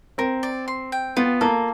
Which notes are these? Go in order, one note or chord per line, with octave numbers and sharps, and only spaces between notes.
C4 A#4
D5
C6
G5
B3 F4
A#3 A4